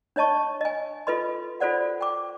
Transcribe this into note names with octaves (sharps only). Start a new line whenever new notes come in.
D4 C#5 D#5 A5 C#6
D#5 G#5
F4 A4 B4 D#5 C6
F4 F#4 A4 C5 D5 F#5
G5 D6